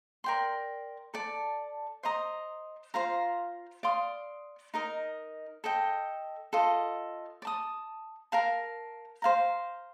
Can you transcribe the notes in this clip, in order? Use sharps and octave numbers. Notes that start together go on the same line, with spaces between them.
A#4 D5 G5 C6
A4 D5 A5
C5 D#5 A#5 D#6
F4 C5 F5 A#5
D5 F5 C6 D#6
D#4 A#4 D#5
A4 D#5 G5
F4 A4 D#5
D5
A5 D#6
A#4 F5 A5
C5 F5 A#5